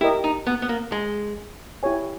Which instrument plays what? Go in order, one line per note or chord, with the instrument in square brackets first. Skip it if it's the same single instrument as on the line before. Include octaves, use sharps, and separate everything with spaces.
[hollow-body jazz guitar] E4 [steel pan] G4 A#4 D#5
[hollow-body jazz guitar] D#4
B3
B3
A#3
G#3
[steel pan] E4 G4 C#5 G#5